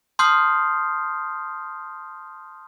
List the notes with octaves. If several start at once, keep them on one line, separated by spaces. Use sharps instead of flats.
A5 C6 D#6 F6 G6 C7